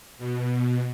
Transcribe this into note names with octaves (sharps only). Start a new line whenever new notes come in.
B2